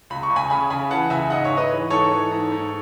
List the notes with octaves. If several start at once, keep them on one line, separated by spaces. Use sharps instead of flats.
C#2 B5
C#6
C#2
G#5 B5
C#3 G#5 B5
C#3 G#5 B5
E3 F#5 A5
C#2 E5 G#5
G#2 D#5 F#5
C#5 E5
G#2
B4 D#5
E3
G#2 A4 C#5
E3
G#2
G#2